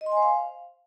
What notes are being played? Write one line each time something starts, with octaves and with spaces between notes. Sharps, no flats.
D#5
C6
G#5
C5
F5